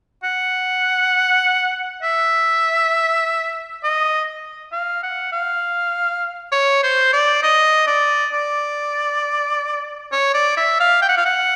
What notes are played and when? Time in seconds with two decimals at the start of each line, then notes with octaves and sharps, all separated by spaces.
0.24 F#5
2.03 E5
3.83 D#5
4.72 F5
5.03 F#5
5.32 F5
6.52 C#5
6.83 C5
7.13 D5
7.43 D#5
7.87 D5
8.33 D5
10.12 C#5
10.34 D5
10.57 E5
10.80 F5
11.02 G5
11.09 F#5
11.17 F5
11.26 F#5